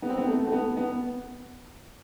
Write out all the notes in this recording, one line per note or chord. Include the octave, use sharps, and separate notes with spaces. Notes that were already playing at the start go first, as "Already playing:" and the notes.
B3
C4
B3
A3
A3
B3
B3